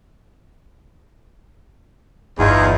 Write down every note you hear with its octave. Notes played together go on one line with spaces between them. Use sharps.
G1 E2 D#4 F4 G#4